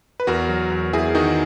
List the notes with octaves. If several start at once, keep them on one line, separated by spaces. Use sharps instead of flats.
B4
E2 F#4 A#4
F#3
E2
E2 E4 G#4
D#3 D#4 F#4